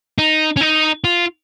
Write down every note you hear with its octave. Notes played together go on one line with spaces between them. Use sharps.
D#4
C#4
D#4
F4